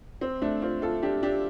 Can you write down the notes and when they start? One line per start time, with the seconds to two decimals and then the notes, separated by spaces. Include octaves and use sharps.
0.21 C4
0.41 A3 D4
0.62 C4 F4
0.82 F4 A4
1.03 D4 G4
1.23 D4 G4